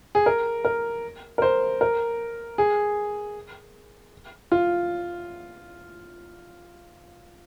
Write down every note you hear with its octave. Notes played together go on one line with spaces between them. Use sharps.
G#4
A#4
A#4
A#4
C5
A#4
G#4
F4